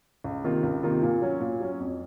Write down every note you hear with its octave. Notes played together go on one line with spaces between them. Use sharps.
C#2
C3 D#3 A#3 F4
C#2
C3 D#3 A#3 F4
A#2
F#3 C#4
A#2
F#3 C#4
F2